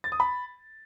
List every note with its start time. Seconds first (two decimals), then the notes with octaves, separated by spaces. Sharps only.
0.04 A6
0.12 D#6
0.20 B5